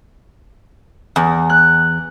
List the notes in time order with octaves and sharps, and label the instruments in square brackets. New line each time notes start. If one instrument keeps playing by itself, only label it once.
[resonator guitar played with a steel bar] E2
[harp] F#6